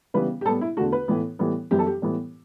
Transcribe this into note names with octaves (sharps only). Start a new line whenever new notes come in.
C#3 E3 G3 B3 B4
G4
A2 G3 B3 A4
E4
E2 D3 A3 F#4
B4
A2 E3 B3
A2 E3 G3 B3
F#2 E3 G3 B3 G4
A4
G4
A2 E3 G3 B3